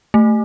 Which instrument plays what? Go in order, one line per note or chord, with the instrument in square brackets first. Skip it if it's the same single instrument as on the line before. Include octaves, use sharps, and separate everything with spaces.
[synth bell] A3